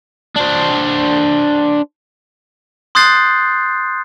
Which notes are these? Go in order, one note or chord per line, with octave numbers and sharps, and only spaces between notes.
D4 C5
C6 D#6 F#6 G6 A6 C7